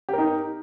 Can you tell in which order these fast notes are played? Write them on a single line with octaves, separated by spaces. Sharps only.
G4 A#4 D#4